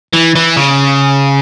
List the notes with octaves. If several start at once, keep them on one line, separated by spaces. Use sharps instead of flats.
E3
E3
C#3